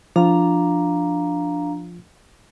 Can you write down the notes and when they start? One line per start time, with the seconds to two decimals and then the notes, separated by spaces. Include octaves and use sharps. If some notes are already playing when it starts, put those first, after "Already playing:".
0.16 F3 D4 F4 F5 A#5